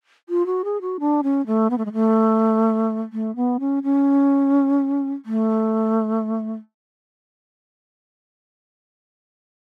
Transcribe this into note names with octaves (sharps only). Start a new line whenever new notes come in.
F4
F#4
G#4
F#4
D4
C#4
A3
B3
A3
G#3
A3
A3
B3
C#4
C#4
A3